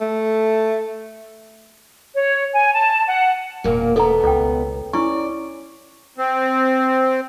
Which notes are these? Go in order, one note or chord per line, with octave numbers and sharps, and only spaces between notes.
A3
C#5
G#5
A5
F#5
E1 A#2 A#3
B2 A3 B3 A4 A#5
C#2 A4 G5
C#4 E4 D5 C#6
C4